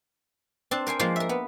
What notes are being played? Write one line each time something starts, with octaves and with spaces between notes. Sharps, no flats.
C4 D4 A5
A#4 C5 G5 G#5
F3 G#3 A#3 F4 C5
A#4 E5
B3